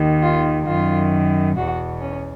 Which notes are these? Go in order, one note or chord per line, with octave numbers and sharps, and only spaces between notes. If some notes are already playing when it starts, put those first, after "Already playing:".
Already playing: D#2 D#3
F4
F#2 D#3 F4
E2 B2 F#4
C#4